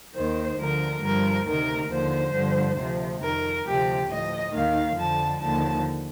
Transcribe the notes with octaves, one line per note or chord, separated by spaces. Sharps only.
D#2 D#3 C5
D2 D3 F3 A#4
G2 F3 A#4
D2 C3 D#3 A#4
D#2 D3 F3 C5
G2 D3 F3
D2 C3 F3
F2 D#3 A#4
D2 C3 F3 G4
A2 F3 D#5
D#2 D#3 F5
F2 D3 F3 A5
D#2 D3 F3 A5